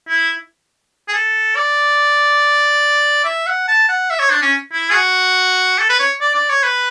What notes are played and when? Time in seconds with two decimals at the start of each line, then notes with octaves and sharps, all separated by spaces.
0.09 E4
1.08 G#4
1.13 A4
1.56 D5
3.24 E5
3.46 F#5
3.68 A5
3.89 F#5
4.10 E5
4.19 C#5
4.31 D4
4.42 C#4
4.73 E4
4.90 G#4
4.93 F#4
5.78 A4
5.89 B4
6.00 C#5
6.21 D5
6.35 D5
6.49 C#5
6.63 B4